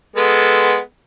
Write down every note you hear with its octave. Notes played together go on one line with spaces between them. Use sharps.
G#3 B3 A4